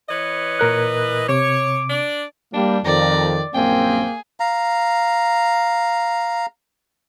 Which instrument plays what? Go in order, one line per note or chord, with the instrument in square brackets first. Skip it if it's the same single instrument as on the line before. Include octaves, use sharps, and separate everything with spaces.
[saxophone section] E3 B4 D#5 [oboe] C#5
[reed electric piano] A#2 A#4 F#6
[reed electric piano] C3 [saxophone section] C#5 [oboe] D6
[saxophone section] D4 D5
[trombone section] G3 [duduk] A#3 [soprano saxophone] D4
[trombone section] F2 [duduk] D#3 [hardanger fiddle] D5 [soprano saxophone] A#5
[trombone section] A#1 F#2 C4 [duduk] A#3 [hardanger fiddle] G#4 [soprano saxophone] G5
[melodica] F5 A#5